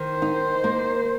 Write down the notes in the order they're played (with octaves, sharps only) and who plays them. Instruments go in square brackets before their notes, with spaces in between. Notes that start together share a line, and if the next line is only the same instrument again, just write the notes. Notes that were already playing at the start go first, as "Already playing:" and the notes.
Already playing: [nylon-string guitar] D#3 [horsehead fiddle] C5
[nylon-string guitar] D#4
A#3